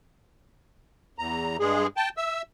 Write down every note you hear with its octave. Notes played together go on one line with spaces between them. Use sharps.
E2 A#5
G2 G#3 G#4
G5 A5
E5 E6